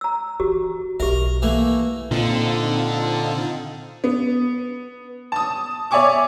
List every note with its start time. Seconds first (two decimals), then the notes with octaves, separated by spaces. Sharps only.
0.01 A#5 E6
0.40 E3 F#4 G4
1.00 B1 G4 A#4 E5
1.42 E3 A3 A#3
2.11 A#2 D3 C4 D#4 F4
4.04 B3
5.32 A5 D#6
5.91 C#5 D5 E5 G#5 C#6 D6